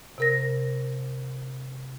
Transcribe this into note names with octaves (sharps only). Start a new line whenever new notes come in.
C3 A#4 A#6